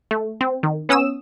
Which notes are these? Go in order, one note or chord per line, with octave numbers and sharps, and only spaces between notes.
A3
C4
D#3
B3 C#4 D#6 E6 E7